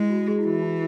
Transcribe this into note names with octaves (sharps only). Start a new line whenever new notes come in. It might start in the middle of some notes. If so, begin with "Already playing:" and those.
Already playing: G#3 E4
F#4
G#4
E4
E3 F#4
E4